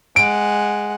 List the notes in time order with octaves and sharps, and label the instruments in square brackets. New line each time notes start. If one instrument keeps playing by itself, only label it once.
[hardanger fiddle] G#3 F#5 [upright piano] D7